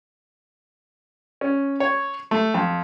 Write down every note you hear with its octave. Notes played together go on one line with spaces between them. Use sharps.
C#4
C#5
A3
F2